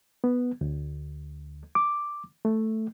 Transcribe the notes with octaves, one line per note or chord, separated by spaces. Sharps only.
B3
D2
D6
A3